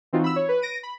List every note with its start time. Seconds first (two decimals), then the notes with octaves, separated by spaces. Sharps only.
0.13 E3 C4 D#4 F4 F#4
0.24 B5 E6
0.36 C#5
0.49 B4
0.62 A#6 D7 D#7
0.83 B5